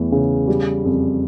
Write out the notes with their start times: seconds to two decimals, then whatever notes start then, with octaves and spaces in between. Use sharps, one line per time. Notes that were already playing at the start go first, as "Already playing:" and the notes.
Already playing: E2 E3 A3
0.12 C#3
0.48 G3
0.85 F2